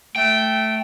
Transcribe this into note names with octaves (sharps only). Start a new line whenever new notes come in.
A3 G5